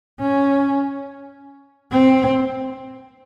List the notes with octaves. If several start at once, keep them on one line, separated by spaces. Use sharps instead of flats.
C#4
C4